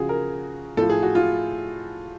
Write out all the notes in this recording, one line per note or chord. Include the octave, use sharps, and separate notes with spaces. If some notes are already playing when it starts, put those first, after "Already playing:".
Already playing: C#3 F3 F#4 G#4
A#4
A2 F3 A4
G#4
F#4
F4